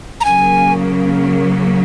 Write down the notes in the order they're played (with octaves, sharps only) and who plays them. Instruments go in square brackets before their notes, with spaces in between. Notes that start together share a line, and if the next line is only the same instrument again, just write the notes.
[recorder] A#5
[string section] C#3 F#3 A#3 [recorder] G#5